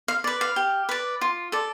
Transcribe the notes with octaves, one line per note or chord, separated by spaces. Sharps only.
F5
B4 D5
F5
G4
B4 D5
F4
A4 D5